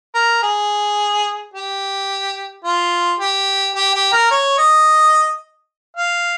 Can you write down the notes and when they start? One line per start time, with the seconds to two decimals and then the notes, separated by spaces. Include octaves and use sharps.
0.15 A#4
0.43 G#4
1.54 G4
2.65 F4
3.20 G4
3.75 G4
3.95 G4
4.12 A#4
4.31 C#5
4.58 D#5
5.97 F5